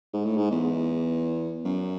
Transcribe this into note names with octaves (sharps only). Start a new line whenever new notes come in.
G#2
A2
G#2
E2
F#2